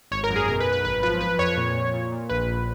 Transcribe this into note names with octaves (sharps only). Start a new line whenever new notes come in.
G#1 C#5
A#4
F#2
G#4
B1 A#4
B4
B1
B4
G#1 B4
F3 B4
F3 B4
F2 C#5
A#2
A#2
A#2
A#2
A#1 B4
A#1